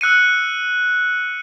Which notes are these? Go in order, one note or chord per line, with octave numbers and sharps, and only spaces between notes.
E6 F#6 C#7 D#7